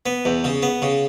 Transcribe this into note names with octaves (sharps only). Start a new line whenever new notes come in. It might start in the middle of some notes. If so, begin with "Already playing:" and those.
B3
E2
C#3
B3
C#3